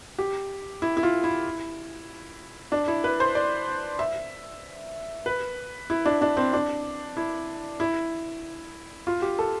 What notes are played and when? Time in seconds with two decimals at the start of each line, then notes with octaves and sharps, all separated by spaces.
0.18 G4
0.82 E4
0.97 E4
1.03 F4
1.24 E4
2.72 D4
2.88 E4
3.04 B4
3.20 C5
3.35 D5
3.99 E5
5.26 B4
5.90 E4
6.06 D4
6.21 D4
6.37 C4
6.53 D4
7.17 E4
7.80 E4
9.07 F4
9.22 G4
9.39 A4